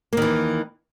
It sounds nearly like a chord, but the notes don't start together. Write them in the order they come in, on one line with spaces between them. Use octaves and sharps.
A#3 D#3 E3